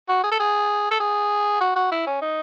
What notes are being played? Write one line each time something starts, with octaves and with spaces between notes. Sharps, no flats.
F#4
G#4
A4
G#4
A4
G#4
F#4
F#4
E4
C#4
D#4